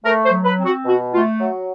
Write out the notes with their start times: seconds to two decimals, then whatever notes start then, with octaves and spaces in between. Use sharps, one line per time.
0.04 A3 A#4
0.25 C5
0.31 F#3
0.44 B4
0.58 C4
0.65 F#4
0.85 B2 F#4
1.13 A3 F4
1.40 F#3